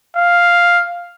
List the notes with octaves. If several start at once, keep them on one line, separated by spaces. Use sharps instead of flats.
F5